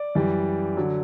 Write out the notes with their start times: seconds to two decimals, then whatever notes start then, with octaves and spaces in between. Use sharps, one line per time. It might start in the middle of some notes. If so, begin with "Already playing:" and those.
Already playing: D5
0.15 F#2 E3 G3
0.77 D3 F#3